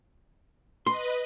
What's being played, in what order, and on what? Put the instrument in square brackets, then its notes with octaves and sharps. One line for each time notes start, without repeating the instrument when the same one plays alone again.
[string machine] B4 D#5 [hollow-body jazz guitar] C6